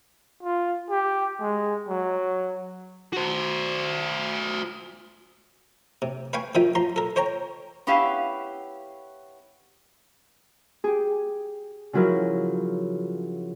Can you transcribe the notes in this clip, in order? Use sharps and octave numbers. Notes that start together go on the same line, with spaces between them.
F4
G4
G#3
F#3
F#4 C5
C3
B4 F5 G5 G#5 C#6
D#3 F3 F4 E5 G5 D#6
F3 A#5 C6
A4 A#4
C5 C#5 G5 A#5
B3 C#4 E4 G4 F5
G4 G#4
C#3 F3 F#3 E4 A#4